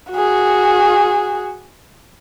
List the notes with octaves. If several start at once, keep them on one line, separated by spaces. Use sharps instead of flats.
F#4 G#4